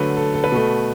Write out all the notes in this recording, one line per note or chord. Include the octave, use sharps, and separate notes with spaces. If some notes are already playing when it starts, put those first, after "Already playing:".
Already playing: D3 F#3 A3 B4
A4
A4
B4
B2 A3